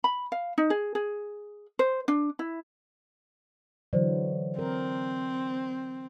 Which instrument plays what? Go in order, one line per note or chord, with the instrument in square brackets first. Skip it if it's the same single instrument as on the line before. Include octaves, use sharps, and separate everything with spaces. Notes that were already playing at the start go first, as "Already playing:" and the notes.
[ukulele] B5
F5
D#4
G#4
G#4
C5
D4
E4
[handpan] D3 E3 F#3 [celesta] C5 D5
[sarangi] C4 [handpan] A#4